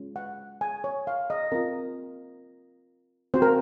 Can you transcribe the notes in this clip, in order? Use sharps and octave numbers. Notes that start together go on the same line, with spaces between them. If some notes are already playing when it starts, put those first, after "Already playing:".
Already playing: G#3 C#4 F4
F#5
G#5
C#5
F5
D#5
C4 F4 A#4
C4 F#4 C5
A#4